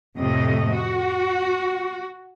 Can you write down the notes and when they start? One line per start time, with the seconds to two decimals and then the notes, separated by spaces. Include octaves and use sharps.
0.17 F2 A2 C3 A3 D#5
0.74 F#4